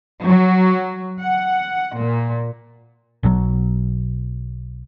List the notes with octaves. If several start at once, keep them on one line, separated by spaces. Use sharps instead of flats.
F#3
F#5
A#2
B1 B2 D3 F#3